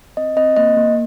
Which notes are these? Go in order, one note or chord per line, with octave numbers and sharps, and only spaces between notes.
C4 D#5
C4 D#5
A#3 D#5
A#3